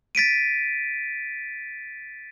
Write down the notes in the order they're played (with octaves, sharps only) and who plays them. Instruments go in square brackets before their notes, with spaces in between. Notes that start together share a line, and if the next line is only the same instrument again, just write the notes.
[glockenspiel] A6 B6 D7 D#7